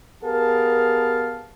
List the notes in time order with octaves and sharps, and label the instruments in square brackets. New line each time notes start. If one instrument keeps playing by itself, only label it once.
[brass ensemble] B3 G4 G#4 A#4 F5 A5